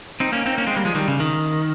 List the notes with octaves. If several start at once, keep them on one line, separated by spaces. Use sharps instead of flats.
C4 D#4
A#3 C#4
C4 D#4
A#3 C#4
G#3 C4
G3 A#3
F3 G#3
D#3 G3
C#3
D#3